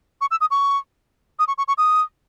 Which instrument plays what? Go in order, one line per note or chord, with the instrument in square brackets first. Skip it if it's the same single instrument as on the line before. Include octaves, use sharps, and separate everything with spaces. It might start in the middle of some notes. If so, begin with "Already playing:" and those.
[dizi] C#6
E6
D#6
C#6
D#6
C#6
C#6
C#6
D#6